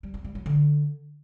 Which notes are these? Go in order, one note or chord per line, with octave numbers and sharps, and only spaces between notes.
G3
C4
G3
F#3
D3